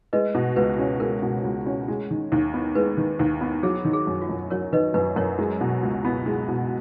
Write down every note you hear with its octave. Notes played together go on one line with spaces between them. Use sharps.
G#3 B4 D#5
B2
C#2 B4
C#4
G#3 A#4
B2
C#2
C#4
G#3
D#3
D#2
B3
G#3 B4
D#3
D#2
B3
F#3 G#4
D#3
G#4
F#2
F4
F#2
F#3 A#4 C#5
D#3 B4 D#5
F#2 B4
F#2 A#4 C#5
G#3
B2
C#2
B3
G#3
B2